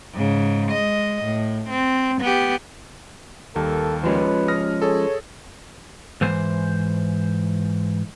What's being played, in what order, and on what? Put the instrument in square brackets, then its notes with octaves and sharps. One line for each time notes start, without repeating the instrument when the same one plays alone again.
[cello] G#2 C#3
G#3 D#5
A2
C4
B3 G4
[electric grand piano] D#2 G3 A#3 [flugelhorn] A4
[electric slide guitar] F3 G#3 C#4 [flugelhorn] B4
[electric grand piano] D#6 F6 A#6
[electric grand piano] G#4 A4 [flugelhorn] C#5
[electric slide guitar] G#2 E3 C5